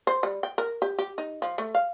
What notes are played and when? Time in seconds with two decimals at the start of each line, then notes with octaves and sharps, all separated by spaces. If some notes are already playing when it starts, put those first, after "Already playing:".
0.07 C5
0.23 G3
0.43 G5
0.58 A#4
0.82 G4
0.98 G4
1.18 D#4
1.42 F3
1.58 A3
1.75 F5